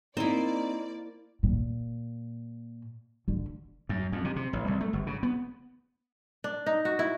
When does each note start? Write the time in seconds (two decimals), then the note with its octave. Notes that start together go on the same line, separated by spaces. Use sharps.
0.17 A#3 C4 D#4 E4 C5 D5
1.43 A#2
3.28 D3
3.89 F#2
4.12 F2
4.24 C3
4.36 C3
4.53 A1
4.67 C2
4.81 A3
4.93 G1
5.07 C#3
5.23 B3
6.44 D4
6.66 D#4
6.85 F#4
6.99 E4